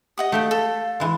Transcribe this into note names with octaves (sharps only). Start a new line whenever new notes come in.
G4 D#5 F#5 D#6
A3 G4 E5 F5
A4
E3 G#3